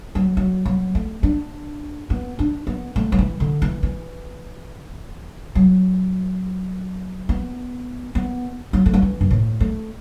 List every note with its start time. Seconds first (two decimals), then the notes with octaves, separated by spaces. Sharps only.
0.15 F#3
0.37 F#3
0.65 F#3
0.95 A3
1.23 D4
2.10 B3
2.39 D4
2.67 B3
2.96 A3
3.12 F#3
3.19 E3
3.40 D3
3.62 E3
3.83 E3
5.55 F#3
7.29 B3
8.15 B3
8.73 F#3
8.86 A3
8.94 F#3
9.02 E3
9.21 F#2
9.31 A2
9.60 A3